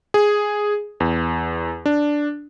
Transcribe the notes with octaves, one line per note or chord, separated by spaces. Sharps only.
G#4
E2
D4